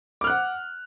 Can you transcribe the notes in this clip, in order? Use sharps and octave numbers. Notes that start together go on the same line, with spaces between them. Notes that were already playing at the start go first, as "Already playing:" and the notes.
F#5 D6 F6 F#6